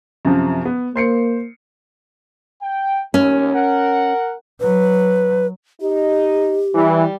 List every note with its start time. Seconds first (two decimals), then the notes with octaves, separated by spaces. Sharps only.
0.25 F#2 C3 F3
0.65 B3
0.96 A#3 C5 C7 C#7
2.62 G5
3.14 D#2 C#4
3.53 A#4 F#5
4.61 F#3 B4
5.81 D#4 G4
6.75 E3 G3